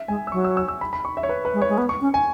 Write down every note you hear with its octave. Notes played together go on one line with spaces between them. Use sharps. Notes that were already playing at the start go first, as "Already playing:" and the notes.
Already playing: E5
G#3 G#5
E6
F#3 C#6
E6
E6
E6
B5
B5
C#6
E5
C#5
B4
B4
G#3
C#5
G#3
B3
C#6
C#4
G#5